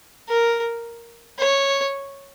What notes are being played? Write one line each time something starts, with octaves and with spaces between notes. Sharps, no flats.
A#4
C#5